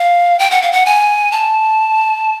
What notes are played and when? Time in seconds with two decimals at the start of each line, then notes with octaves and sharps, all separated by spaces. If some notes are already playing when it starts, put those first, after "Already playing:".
Already playing: F5
0.39 G5
0.51 F#5
0.62 F5
0.72 F#5
0.86 G#5
1.32 A5